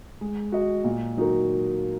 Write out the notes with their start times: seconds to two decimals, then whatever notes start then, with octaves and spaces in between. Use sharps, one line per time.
0.21 G#3
0.52 F#4 D#5
0.84 A#2
1.17 F#3 D#4 F#4 A#4